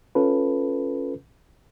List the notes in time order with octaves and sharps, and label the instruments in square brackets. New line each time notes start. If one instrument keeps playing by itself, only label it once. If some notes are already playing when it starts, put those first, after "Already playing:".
[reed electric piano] C#4 F4 A4 B4